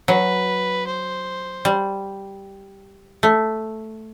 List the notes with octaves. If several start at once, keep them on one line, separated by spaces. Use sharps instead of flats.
F#3 B4
C5
G3
A3